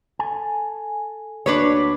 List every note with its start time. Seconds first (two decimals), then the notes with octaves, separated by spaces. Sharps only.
0.19 A4 G#5
1.46 D2 A#3 D4 F#4 B4 C#5